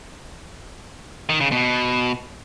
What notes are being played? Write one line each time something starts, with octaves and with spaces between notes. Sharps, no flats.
D#3
C#3
B2